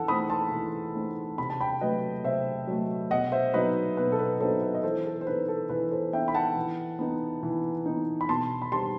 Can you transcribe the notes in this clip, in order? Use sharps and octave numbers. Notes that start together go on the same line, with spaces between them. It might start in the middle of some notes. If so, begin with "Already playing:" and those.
Already playing: E3 A4 F#5 A5
A3 C4 D#4 B5 D#6
A5 C6
E3
A3 C4 D#4
C3 B5
A5
G5 B5
F#3 A3 B4 D#5
C3 C5 E5
F#3 A3
B2 D#5 F#5
C5 E5
F#3 B3 D#4 B4 D#5
B2 B4
A4
B4
F#3 B3 D#4 A4 C5
B4
D#5
E3 A4 C5
A4
C5
B3 D#4 B4
A4
E3 B4
A4 C5
B3 D#4 E5 G5
B5
F#5 A5
E3
B3 D#4
E3
B3 D#4
B5
B2 A5 C6
B5
G3 C4 D#4 A5 C6